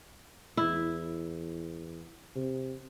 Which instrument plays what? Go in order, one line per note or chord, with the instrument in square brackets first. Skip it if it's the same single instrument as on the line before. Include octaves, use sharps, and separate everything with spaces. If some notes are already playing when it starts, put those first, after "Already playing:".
[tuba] E2 [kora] E4
[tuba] C3